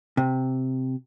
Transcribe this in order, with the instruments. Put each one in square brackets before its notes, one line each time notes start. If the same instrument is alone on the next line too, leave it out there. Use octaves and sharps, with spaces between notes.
[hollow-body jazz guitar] C3